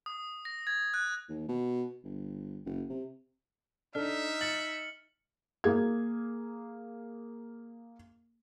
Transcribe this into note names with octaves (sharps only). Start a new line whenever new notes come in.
D#6
A#6
G#6
F#6
D#2
B2
G1
F#1
C3
D4 D#4 A4 E5 F6
A6 C#7 F#7
A#3 G#4 G#6